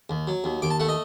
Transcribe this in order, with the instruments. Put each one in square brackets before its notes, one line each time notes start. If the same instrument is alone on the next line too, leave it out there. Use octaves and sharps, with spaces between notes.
[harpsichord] D#2
F#3
D#2
D#2 D6
A5
A3 F#5
D#5